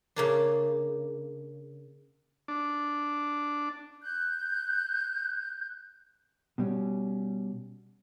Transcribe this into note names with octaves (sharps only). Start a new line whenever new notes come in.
C#3 A#3 D4
D4
F#6 G6
B2 G3 C#4